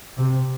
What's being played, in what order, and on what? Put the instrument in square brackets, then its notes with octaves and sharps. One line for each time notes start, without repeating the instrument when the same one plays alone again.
[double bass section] C3